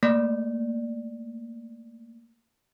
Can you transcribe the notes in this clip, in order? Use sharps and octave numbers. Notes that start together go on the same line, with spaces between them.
A3 A#3 D5